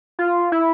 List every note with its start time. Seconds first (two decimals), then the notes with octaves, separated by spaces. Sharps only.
0.19 F4
0.52 E4